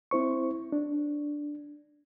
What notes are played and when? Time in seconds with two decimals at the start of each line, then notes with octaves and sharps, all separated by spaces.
0.11 C4 E4 C5 C#6
0.72 D4